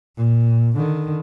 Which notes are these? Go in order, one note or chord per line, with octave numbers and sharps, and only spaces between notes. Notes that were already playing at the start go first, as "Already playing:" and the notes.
A#2
D3 D#3